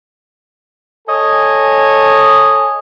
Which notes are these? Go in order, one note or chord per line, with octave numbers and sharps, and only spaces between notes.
A4 C#5 D#5 G#5